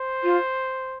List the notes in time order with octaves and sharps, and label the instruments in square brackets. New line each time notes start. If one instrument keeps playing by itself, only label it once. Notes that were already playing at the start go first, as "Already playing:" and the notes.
Already playing: [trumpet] C5
[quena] F4